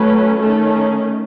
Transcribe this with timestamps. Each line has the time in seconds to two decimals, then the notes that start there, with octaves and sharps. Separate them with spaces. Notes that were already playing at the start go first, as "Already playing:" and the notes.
Already playing: F#3 A3 C#4 B4
0.39 D#3 A3 C#4 A4